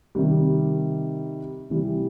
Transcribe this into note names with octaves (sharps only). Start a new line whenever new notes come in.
C3 D#3 G3
C3 E3 G3